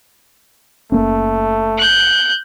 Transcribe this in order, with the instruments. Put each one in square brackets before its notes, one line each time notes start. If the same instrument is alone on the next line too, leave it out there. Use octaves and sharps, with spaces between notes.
[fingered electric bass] F#1 A#3 C#4 [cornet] A3
[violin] F#6 G6